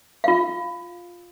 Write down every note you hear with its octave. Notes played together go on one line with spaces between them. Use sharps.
F4 F5